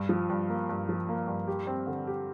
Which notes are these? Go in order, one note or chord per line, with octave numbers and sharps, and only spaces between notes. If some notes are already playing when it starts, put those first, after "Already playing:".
Already playing: G2
F3
G2
A#3
G2
F3
A#3
G2
G4
C4
D3
G4